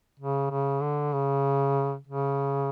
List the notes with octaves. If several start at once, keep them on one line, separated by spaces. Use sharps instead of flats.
C#3
C#3
D3
C#3
C#3